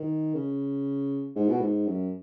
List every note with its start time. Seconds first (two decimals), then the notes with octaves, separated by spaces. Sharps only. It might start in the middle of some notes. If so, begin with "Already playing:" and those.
Already playing: D#3
0.35 C#3
1.35 G#2
1.49 B2
1.60 G#2
1.87 F#2